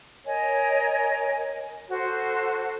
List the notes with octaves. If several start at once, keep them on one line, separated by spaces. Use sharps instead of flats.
A#4 C#5 D#5 G#5
F#4 A4 C5